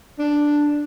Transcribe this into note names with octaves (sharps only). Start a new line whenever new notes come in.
D4